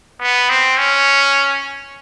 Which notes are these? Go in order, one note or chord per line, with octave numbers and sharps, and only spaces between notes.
B3
C4
C#4